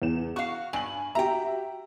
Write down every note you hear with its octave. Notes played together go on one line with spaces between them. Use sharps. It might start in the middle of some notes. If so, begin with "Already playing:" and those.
E2 E7
F#4 F5 C#6
G2 G#5 F#7
F#4 G4 E5 G5 A#5